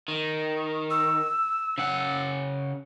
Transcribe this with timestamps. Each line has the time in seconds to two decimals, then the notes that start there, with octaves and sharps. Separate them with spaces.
0.08 D#3
0.90 E6
1.78 C#3 F#5